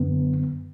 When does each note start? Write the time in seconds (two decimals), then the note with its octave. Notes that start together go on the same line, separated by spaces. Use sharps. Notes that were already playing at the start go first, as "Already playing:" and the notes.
Already playing: F#2 D3 B3